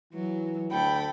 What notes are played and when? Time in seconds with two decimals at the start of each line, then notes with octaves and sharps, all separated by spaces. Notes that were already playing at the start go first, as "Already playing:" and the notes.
0.13 E3 F#3
0.72 D2 A4 G5 B5